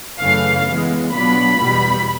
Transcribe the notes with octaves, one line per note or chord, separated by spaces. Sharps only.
F#2 C#3 E3 A3 F5
E3 G#3 B3
B2 F#3 B3 D4 F4 B5
E2 B2 G3 B3